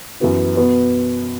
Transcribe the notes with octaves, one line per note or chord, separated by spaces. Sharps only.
F#2 E3 B3 F#4
B2 B3 F#4